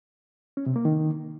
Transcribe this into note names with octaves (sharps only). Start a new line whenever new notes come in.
C#4
C3
A#3
D#3